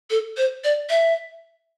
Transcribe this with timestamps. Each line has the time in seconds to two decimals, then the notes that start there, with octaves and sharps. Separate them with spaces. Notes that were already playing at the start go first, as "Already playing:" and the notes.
0.10 A4
0.37 C5
0.64 D5
0.90 E5